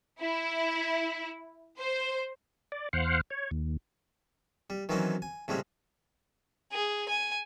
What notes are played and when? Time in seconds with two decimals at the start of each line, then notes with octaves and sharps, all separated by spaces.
0.21 E4
1.79 C5
2.72 D5
2.93 E2 C5 F5 F#5
3.30 C#5
3.51 D#2
4.70 G3
4.89 D#3 E3 F#3 C4 C#4 D#4
5.22 G#5
5.48 A2 C#3 G3 G#3 C4
6.73 G#4
7.09 G#5